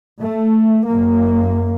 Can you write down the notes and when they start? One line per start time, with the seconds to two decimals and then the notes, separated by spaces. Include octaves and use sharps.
0.20 A3
0.87 F#2 A#3